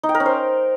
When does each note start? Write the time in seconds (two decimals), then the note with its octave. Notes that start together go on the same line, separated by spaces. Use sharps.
0.03 D#4
0.09 G5
0.15 A#4
0.20 C#4
0.26 C5